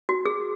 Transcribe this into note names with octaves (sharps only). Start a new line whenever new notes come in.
F#4
G#4